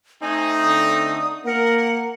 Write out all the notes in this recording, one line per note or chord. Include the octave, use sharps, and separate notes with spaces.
A3 C4 D#4 G#5
D3 D#6
A#3 A#4 F#5